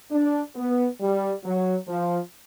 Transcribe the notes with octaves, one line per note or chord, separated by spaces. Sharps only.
D4
B3
G3
F#3
F3